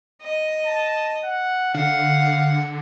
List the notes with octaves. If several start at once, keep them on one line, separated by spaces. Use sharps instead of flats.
D#5
A5
F#5
D3 F5 F#5